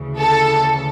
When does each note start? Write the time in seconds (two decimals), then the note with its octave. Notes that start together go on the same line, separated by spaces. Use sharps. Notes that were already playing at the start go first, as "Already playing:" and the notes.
Already playing: D2 C#3 E3
0.19 A4